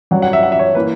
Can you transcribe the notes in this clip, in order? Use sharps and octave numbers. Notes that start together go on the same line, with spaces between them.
G2 F#3 C#4 F#5
F#5
E5
F#5
E5
C#5
E3 A#3 B4